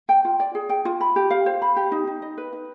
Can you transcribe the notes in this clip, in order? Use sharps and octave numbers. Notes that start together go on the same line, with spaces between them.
G5
F4
D5
G#4
G5
F4
B5
G4
F5
C5
B5
G4
D#4
D#4
D#5
B4
D#4